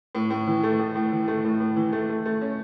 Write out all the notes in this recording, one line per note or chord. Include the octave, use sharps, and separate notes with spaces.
A2
A2
E3
A3
A2
A2
E3
A3
A2
A2
E3
A3
A3
A3
C#4